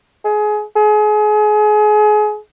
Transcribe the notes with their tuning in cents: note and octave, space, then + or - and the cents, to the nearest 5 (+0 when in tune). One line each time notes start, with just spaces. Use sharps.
G#4 +25
G#4 +30